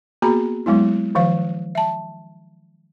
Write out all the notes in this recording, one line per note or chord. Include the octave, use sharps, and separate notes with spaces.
A#3 B3 F#4 G#4 A#5 B5
F#3 G#3 B3 E4
D#3 F3 F5
E5 A5